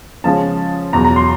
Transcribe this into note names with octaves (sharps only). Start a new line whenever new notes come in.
C#3 F3 G#3 C#4 A5
E2 B2 F#3 A#5
A#5
C6